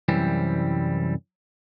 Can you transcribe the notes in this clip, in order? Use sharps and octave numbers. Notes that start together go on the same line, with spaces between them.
C2 F#2 E3 G3 C4